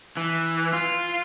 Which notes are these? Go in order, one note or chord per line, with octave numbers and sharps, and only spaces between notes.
E3
F4